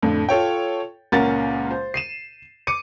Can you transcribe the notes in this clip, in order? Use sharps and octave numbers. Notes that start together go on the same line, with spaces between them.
F2 A2 D3
F4 A4 C#5 G5
C#2 A#2 C#4 A#4 F#5 A6
C5
C7 D#7 E7
D6 C#7 D#7